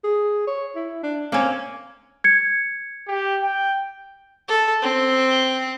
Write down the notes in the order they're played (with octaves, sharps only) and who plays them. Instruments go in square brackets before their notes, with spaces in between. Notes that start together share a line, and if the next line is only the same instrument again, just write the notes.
[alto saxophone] G#4
C#5
E4
D4
[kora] A#3 C#4 [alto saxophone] C4
[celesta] G#6 C#7
[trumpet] G4
G5
[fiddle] A4
C4